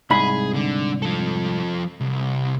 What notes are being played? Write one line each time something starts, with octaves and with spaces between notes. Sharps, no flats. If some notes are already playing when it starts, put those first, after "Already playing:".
C2 G#2 G#4 B5
D3 D4
F3 A4
C2